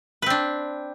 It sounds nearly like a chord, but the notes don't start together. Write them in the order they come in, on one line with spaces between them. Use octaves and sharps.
B4 C4 D4